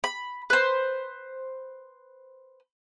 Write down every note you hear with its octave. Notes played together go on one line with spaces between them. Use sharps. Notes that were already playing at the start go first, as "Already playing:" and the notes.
B5
B4 C5